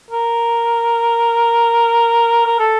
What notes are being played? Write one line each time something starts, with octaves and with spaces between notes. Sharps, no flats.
A#4
A#4
A4